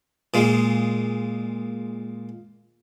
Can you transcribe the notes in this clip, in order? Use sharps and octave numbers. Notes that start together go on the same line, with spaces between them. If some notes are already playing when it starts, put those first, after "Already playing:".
A#2 G#3